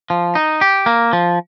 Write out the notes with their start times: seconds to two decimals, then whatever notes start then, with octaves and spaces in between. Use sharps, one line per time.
0.10 F3
0.35 D#4
0.61 G4
0.86 A#3
1.13 F3